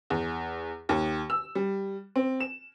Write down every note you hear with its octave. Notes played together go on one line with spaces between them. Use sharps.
E2
D#2
E6
G3
C4
E7